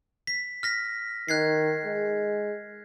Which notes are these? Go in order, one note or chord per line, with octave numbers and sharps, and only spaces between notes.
B6
F6 A#6 B6
D#3 F#6 G#6 C7
G#3